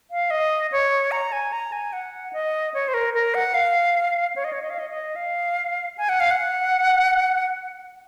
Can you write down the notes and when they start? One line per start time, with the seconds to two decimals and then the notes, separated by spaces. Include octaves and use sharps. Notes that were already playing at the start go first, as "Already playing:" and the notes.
0.11 F5
0.30 D#5
0.72 C#5
1.12 A#5
1.32 G#5
1.53 A#5
1.72 G#5
1.93 F#5
2.33 D#5
2.74 C#5
2.88 C5
2.94 A#4
3.14 A#4
3.34 F#5
3.54 F5
4.36 C#5
4.44 D#5
4.53 C#5
4.63 D#5
4.70 F5
4.79 D#5
4.90 D#5
5.16 F5
5.98 G#5
6.09 F#5
6.20 F5
6.31 F#5